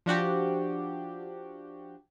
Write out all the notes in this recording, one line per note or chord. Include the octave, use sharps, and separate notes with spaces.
F3 D4 F#4 G4